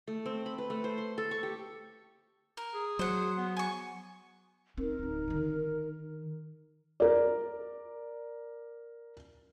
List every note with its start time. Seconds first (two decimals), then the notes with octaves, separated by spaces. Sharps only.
0.07 A3
0.26 C4
0.46 B5
0.58 B4
0.70 A3
0.84 C5
0.98 C6
1.18 A4
1.31 C#6
1.43 G4
2.57 A#4
2.74 G#4
2.99 F#3 C5 F#5
3.38 B3
3.57 G#5 C#6
4.78 C4 D#4 A#4
4.99 D1 D2
5.28 D3 D#3
7.00 A#4 D5